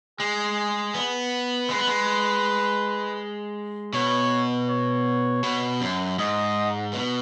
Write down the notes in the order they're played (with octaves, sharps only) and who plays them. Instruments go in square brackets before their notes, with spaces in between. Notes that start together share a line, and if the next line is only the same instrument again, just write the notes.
[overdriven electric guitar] G#3 [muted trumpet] G#4
[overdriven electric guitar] B3
[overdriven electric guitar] G#3 [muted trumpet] B4
[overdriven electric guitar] B3
G#3
[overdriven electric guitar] B2 [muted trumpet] C#5
[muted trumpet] C#5
[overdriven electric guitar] B2
F#2
[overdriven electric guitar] G#2 [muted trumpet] D#5
[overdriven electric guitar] B2